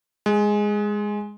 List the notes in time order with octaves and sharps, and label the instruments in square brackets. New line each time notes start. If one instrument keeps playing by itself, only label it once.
[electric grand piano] G#3